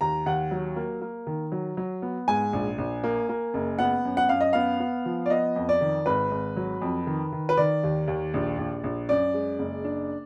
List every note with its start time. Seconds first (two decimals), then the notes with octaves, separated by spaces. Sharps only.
0.01 D#2 A#5
0.26 D#2 F#5
0.51 F#3
0.76 A#3
1.01 A#3
1.27 D#3
1.52 F#3
1.77 F#3
2.02 B3
2.28 G#2 G#5
2.53 A#1
2.78 A#1
3.04 A#3
3.29 A#3
3.54 F#1
3.79 B3 F#5
4.05 F#2
4.17 F#5
4.29 F#2 F5
4.41 D#5
4.53 B3 F5
4.80 B3
5.05 F3
5.26 D5
5.30 B3 D#5
5.56 F2
5.69 D5
5.81 D#3
6.06 G#1 B4
6.32 G#1
6.57 F#3
6.82 F2
7.07 D#3
7.32 D#3
7.49 B4
7.57 D#3 D5
7.83 D#2
8.08 D#2
8.34 A#1
8.58 A#1
8.84 A#1
9.09 F#2 D5
9.34 G#3
9.59 F#1
9.84 D4